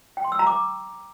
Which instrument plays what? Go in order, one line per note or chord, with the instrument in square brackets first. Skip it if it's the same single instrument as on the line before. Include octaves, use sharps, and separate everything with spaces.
[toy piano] G5
C6
E6
A#5
D6